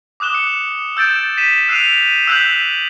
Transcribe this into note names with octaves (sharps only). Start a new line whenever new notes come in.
D6 D#6 F#6 E7 G7
C#7
E6 G6 A6 D7 E7
B6 D#7 E7
E6 F#6 C7 D7 D#7 F7
E6 F#6 G6 B6 F#7